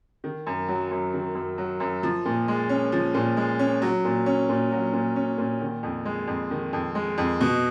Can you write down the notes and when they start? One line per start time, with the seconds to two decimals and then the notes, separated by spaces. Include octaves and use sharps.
0.24 D#3
0.47 F#2
0.68 F#3
0.91 F#2
1.14 D#3
1.35 F#2
1.58 F#3
1.80 F#2
2.03 F3
2.25 A#2
2.48 G#3
2.69 C#4
2.92 F3
3.14 A#2
3.37 G#3
3.59 C#4
3.82 F#3
4.05 A#2
4.26 C#4
4.49 A#2
4.72 F#3
4.93 A#2
5.16 C#4
5.38 A#2
5.61 D#3
5.83 F2
6.05 G#3
6.28 F2
6.51 D#3
6.73 F2
6.95 G#3
7.18 F2
7.41 B2